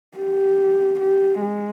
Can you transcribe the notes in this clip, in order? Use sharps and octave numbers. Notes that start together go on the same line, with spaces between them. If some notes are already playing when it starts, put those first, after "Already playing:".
G4
G4
G#3